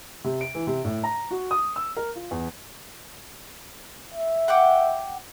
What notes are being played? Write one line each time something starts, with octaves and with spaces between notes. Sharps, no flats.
C3
D7
E3
C3
A2
A#5
F#4
D#6
E6
A#4
F4
E2
E5
F#5 G5 D6